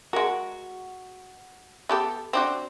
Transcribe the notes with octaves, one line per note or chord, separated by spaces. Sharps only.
G#3 F#4 A#4
B3 G4 A4
C4 D4 F#4